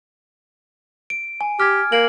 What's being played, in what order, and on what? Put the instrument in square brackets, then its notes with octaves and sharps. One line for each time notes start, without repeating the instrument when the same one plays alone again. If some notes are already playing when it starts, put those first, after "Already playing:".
[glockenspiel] D7
G#5
[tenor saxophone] G4 [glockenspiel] F6 G#6
[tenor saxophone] A#3 [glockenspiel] F#7